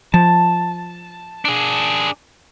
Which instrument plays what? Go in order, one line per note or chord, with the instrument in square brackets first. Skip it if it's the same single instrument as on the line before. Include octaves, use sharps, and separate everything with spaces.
[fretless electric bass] F3 [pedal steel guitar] A5
[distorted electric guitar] D4 G#4